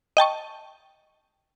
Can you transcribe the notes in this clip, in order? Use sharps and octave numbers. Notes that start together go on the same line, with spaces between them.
D#5 G5 A5 C#6